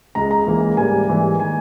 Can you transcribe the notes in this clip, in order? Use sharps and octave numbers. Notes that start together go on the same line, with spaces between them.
C#2 C#3 G#3 A#5
A#5
C#2 C#3 E3 A#3
G#2 G3 A#3 G#5
G#2 E3 G3 A#3
D#3 A#3 G#5